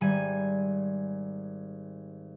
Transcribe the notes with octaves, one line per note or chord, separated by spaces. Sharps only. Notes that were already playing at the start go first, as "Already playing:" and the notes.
G#1 G3 G#5 D#7